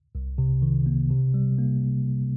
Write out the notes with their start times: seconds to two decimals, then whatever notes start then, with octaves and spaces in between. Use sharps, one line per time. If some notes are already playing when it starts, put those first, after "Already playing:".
0.15 C2
0.38 C3
0.62 D#3
0.86 A#3
1.10 C3
1.34 G3
1.58 A#3